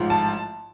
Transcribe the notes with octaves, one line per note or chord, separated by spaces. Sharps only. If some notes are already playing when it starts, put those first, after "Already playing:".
Already playing: A1 G#2 F3
A5